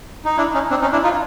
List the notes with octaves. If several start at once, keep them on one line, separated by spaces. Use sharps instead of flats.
D#4
D4 E4
C#4 D#4
C4 D4
C#4 D#4
D4 E4
D#4 F4